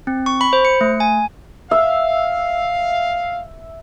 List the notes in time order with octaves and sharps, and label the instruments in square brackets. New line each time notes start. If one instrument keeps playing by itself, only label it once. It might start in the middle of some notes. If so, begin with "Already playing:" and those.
[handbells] C4
C#6
B5
C5
C#7
A3
G#5
[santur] E5 [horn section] F5